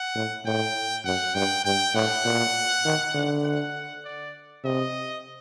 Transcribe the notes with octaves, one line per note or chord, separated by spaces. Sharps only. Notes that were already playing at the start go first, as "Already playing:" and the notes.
Already playing: F#5
A2
A2 G5
F#2 F#5
G2 G5
G2 G5
A2 F#5
A#2
D#3
D3
F#5
D5
C3 D#5